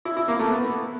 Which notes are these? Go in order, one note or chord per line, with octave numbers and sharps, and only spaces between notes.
E4
E4
A#3
A3
B3